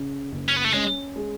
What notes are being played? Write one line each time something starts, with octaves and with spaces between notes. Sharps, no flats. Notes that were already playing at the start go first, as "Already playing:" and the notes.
Already playing: C#3
F#1
C#4
B3
A3
G#3 C#4
G#3